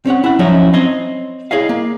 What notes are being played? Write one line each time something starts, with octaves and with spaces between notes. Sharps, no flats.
C4 C#4 C#5 F#5
E4 F#5
F3 F#3 C#4 D#4 E4
C4 C#5 D#5
E4 G#4 C#5 D#5 F5
A#3